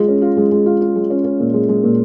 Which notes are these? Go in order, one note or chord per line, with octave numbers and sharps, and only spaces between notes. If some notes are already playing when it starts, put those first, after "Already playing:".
Already playing: G#3 F4
C#4
F4
G#3
G#3
F4
F4
G#3
C#4
C#4
A#2
G#3
G#3
A#2